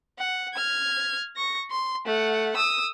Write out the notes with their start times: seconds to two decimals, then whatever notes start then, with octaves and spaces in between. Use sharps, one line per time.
0.19 F#5
0.54 F6 G#6
1.36 C#6 A#6
1.71 C6
2.06 A3 F#5
2.57 D#6 E6